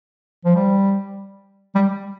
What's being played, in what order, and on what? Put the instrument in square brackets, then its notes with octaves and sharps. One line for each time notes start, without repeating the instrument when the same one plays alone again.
[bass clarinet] F3
G3
G3